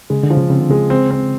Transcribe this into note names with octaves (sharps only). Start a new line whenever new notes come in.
C#3 G#3
D3
F3
C#3
C#3 C4
D3
C#3 G#3
C4
C4